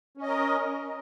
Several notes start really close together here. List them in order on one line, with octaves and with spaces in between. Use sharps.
C#4 D#5 A#4